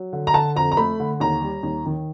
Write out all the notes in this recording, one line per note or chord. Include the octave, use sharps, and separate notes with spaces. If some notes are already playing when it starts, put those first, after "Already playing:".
Already playing: F#3
D3
A#5
D3 A5
F2 A#5
A#5
A3 B5
D3
D#2 A#5
G3
D#2
D#3